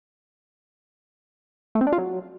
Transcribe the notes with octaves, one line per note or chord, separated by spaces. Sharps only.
A3
C4
D4
F4
F#3